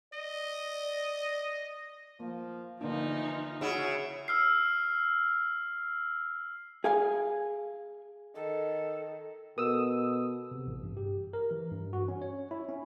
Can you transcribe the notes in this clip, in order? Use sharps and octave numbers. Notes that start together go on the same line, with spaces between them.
D5 D#5
F3 A#3
D3 E3 F3 A#3 D4 D#4
C#3 E4 F#4 G#4
E6 F6 C7
G#4 F5 G#5
D#3 A4
B2 A4 A#4 D#6 E6
C3
A1
G2
G4
A#4
E3
G2
F#4
C#4
C#5
E4
C#4